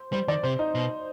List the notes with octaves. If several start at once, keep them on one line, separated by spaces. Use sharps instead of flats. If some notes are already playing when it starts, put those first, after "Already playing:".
Already playing: C5
G3 C5
D#3 D5
C3 C5
D#4
B2